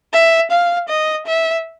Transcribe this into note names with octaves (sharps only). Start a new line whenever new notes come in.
E5
F5
D#5
E5